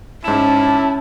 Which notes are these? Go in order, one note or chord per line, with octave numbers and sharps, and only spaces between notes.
G#2 C#4 E4 A5 E7